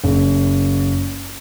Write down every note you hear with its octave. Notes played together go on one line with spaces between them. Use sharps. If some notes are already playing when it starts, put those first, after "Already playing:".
F#1